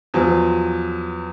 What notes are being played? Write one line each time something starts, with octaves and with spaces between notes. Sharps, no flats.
E2 F3 F#3